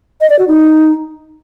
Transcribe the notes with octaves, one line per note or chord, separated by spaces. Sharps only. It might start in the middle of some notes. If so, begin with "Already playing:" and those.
D#5
D5
F#4
D#4